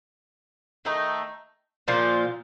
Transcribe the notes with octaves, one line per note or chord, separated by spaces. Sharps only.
D#3 A3 D#4
A#2 F3 A#3 F4